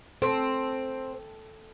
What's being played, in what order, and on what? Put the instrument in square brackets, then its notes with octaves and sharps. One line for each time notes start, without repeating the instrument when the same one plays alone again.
[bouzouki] C4 [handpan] A4